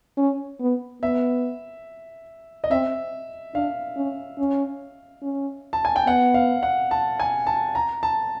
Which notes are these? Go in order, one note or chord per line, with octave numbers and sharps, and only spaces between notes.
C#4
B3
B3 E5
D#5
C4 E5
D4 F5
C#4
C#4
C#4
A5
G#5
G5
B3 F#5
F5
F#5
A5
G#5
A5
A#5
A5